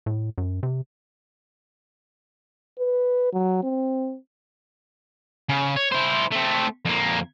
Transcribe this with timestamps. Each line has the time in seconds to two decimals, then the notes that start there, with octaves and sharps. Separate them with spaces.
0.06 A2
0.38 F#2
0.63 C3
2.79 B4
3.33 F#3
3.63 C4
5.49 C#3
5.76 C#5
5.92 E4 C5
6.31 A3 C4
6.85 F2 A#3